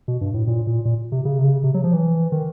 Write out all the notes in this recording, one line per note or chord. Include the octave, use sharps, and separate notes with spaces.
B2
G2
A2
A#2
A#2
A#2
C3
C#3
C3
C#3
C3
F#3
F3
E3
D#3